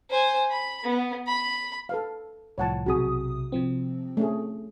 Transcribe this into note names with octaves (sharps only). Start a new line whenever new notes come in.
C5 G#5
B5
B3
B5
A4 B4 F5
C2 A2 F3 C#5 F#5 A5
B1 C3 F#4 G#4 D#6
C3 F3 C4
A3 C#4 G#4